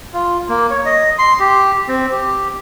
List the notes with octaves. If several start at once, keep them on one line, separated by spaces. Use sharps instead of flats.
F4
A#3
C#5
D#5
C6
G4
C4
G4